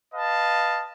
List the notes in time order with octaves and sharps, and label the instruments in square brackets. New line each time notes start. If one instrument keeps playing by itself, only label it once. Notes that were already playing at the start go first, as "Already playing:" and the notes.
[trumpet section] B4 D#5 F5 A5